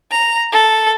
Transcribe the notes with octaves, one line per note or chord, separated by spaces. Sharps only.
A#5
A4